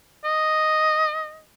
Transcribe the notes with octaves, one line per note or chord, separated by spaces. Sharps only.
D#5